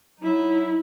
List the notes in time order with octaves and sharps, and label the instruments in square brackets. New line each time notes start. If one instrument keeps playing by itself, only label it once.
[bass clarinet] F#3 [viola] D#4 E4